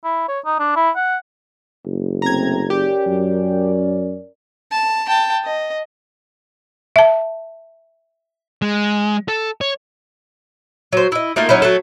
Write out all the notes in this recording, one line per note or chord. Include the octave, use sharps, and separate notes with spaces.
E4
C#5
D#4
D4
E4
F#5
F#1
C3 A3 C4 A#5 G#6
C#4 G4 A#4 D5
F#2
A5
G5 A5
D#5
E5 A5
G#3
A4
C#5
F#3 C5
E4 D#5
A3 A#3 D#4 F4
F#3 C#4 D#4 E4
F#3 A3 A4